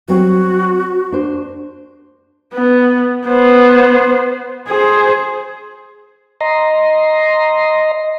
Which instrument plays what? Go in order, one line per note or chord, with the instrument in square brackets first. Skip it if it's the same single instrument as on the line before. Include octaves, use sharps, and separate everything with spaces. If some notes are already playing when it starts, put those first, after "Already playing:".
[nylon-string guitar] F#3 G3 C4 [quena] F#4
[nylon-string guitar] D4 C5
[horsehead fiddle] B3
B3 C5
G#4 C5
[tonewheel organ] D#5 A#5 C6